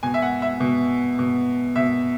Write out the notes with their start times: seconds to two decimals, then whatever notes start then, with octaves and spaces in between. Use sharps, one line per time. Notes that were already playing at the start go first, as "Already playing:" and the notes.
0.03 B2 G#5
0.14 E5
0.22 F#5
0.42 E5
0.60 B2
1.19 B2
1.76 B2 E5